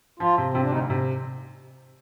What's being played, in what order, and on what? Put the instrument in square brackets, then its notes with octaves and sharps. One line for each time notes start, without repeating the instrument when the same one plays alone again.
[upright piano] F3 [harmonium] F4
[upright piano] C3
[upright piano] C3 [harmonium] C4
[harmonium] D4
[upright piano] D2 [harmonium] D#4
[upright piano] C3